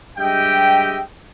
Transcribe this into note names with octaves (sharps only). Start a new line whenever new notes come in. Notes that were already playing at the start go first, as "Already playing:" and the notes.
G2 G#3 G4 D#5 E5 G5